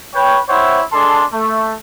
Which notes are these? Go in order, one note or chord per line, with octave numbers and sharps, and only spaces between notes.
B4 C#5 G5
C4 E4 C5 C#5 E5 F#5
G#3 D4 A4 A5 C6
A3